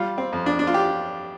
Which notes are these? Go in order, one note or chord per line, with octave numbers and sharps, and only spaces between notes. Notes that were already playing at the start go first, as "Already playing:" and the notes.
Already playing: G3 F4
C4
F2
D4
D4
F4
G4